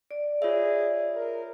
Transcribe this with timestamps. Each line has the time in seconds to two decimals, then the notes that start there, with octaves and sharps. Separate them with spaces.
0.11 D5
0.42 F4 G#4 C#5 E5
1.16 A#4